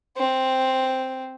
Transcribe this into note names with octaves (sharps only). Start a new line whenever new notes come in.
C4